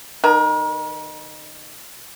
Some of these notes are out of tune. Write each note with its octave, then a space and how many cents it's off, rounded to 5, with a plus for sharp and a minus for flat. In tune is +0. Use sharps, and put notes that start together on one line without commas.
D#3 -25 A#4 +40